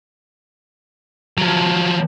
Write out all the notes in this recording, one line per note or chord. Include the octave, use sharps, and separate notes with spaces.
F3 F#3